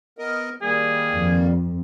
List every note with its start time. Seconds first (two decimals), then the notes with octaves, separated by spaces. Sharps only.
0.18 B3 A#4 D#5
0.62 D#3 G3 A#3 G#4
1.13 F2